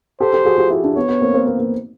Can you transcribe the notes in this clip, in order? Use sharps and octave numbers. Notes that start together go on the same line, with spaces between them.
G4 A4 C5
G4 A4
F#4 G#4
F4 G4
E4 F#4
D4 E4
B3 C#5
B3
A#3 C4
A#3 C4
A#3
A#3